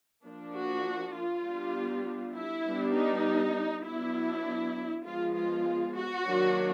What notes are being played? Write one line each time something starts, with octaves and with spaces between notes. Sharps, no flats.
F3 A#3 D4
F#4
F4
G3 B3 D4
E4
G3 B3 D4
D#4
F#3 B3 D4 E4
F3 G#3 B3 F4
F4
F#4
D#3 F#3 A#3 D4